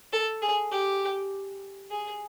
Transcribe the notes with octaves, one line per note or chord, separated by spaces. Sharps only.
A4
G#4
G4
G#4